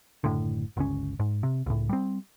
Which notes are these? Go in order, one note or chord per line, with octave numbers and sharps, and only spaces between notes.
F#1 A2 D3
G1 C#2 C#4
G#2
C3
C#2 A2
G3 C4